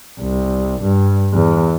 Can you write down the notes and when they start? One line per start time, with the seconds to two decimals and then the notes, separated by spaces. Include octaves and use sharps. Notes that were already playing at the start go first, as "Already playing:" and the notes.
0.20 C2
0.82 G2
1.34 E2